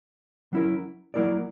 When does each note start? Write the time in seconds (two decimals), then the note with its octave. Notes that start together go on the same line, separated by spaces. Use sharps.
0.53 F#3 C#4 E4 A#4
1.14 F#3 A#3 E4 A#4 D5